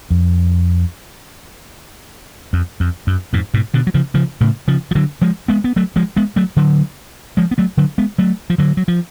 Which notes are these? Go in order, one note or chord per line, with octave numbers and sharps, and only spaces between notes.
F2
F2
F2
F#2
F2 G#2
G#2 B2
B2 D3
F#3
C#3 F3
C#3 F3
A2 C#3
C#3 F3
F3
D3 F#3
F3 G#3
G#3 B3
B3
F#3 A3
F3 G#3
G#3 B3
F#3 A3
D3 F#3
F3 G#3
B3
F#3 A3
D3 F#3
G#3 B3
F#3 A3
F3
D3 F#3
F#3
F3